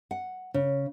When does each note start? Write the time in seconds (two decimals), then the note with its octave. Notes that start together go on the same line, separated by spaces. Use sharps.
0.11 F#5
0.54 C#3